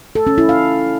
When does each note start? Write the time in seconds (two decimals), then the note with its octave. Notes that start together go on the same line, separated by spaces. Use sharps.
0.15 A4
0.27 C#4
0.38 E4
0.49 F5